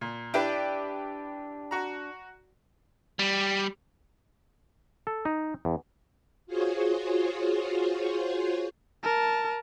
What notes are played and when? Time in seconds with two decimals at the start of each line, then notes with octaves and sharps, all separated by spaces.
0.01 A#2
0.34 D4 E4 G4 B4
1.71 F#4 A#5
3.19 G3
5.07 A4
5.25 D#4
5.65 E2
6.46 F4 F#4 G#4 C5 C#5
9.04 A#4 A5